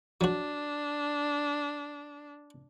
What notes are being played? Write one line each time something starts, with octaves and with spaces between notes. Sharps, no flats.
F#3 D4 F#4